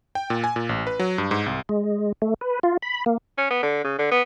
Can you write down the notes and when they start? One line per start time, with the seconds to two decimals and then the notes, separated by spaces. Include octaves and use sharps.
0.15 G5
0.30 A#2
0.44 G#5
0.56 A#2
0.69 A1
0.87 B4
0.99 F#3
1.18 G2
1.31 G#2
1.46 C2
1.69 G#3
2.22 A3
2.41 B4
2.63 F4
2.82 B5
3.06 A#3
3.38 C#4
3.50 B3
3.63 D3
3.84 C#3
3.99 D3
4.11 B3